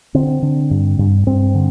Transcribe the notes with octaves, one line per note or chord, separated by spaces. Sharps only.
D3 C4
D3
G2
G2
G2 C4
D3